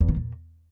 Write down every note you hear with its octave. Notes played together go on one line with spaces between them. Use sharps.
E2
D#3
A#2